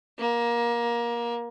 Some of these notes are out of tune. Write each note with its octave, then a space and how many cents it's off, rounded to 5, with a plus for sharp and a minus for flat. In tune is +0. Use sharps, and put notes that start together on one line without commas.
A#3 +20